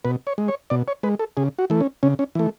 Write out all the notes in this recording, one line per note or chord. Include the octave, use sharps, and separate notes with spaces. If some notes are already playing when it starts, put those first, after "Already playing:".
B2 B4
C#5
G#3
C#5
B2 D5
C#5
G#3 B4
A4
C#3 G#4
F#4
E3 A3
C#4
C#3 C#4
C#4
E3 A3